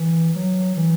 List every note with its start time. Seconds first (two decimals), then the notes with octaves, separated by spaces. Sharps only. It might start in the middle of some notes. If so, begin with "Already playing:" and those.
Already playing: E3
0.36 F#3
0.77 E3